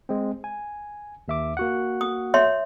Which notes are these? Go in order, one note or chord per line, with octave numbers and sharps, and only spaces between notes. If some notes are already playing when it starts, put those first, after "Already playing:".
G#3 C4
G#5
D#2 E5 D6
A#3 F#4 F#5
D#6
C#5 E5 C6